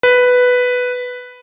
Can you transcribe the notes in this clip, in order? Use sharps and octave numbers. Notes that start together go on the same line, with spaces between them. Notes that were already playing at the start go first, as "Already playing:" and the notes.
B4